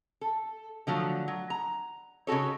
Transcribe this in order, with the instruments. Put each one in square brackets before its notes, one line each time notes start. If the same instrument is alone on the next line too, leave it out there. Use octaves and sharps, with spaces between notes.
[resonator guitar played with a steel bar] A4
D3 F3 F#3 A3
F#3
A#5
C#3 D#4 F#4 A4 C#5